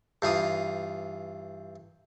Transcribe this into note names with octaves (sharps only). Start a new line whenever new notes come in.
G2 E3 F4 D#6